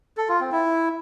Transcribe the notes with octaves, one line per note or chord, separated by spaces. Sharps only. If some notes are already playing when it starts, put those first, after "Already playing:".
A4
F4
C4
E4